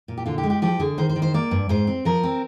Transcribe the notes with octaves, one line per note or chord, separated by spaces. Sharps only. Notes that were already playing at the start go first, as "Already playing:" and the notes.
A#2
G4
D3 F4
G4
G#3
G4
F3 G4
D3 G#4
D#3 C5
C5
D#3
C5
A#3 D5
G2
G#2 C5
C4
F3 A#4
C4